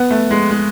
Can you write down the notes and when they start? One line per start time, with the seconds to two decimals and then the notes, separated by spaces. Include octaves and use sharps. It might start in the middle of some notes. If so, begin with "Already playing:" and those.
Already playing: B3
0.11 A3
0.31 G#3
0.50 G#3